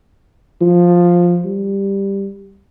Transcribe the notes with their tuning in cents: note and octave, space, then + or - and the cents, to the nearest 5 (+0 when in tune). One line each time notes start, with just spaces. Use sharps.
F3 +5
G3 +10